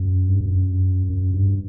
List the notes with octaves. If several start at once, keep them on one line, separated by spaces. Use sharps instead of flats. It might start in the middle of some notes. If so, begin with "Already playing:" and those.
Already playing: F#2
G2
F#2
F#2
G2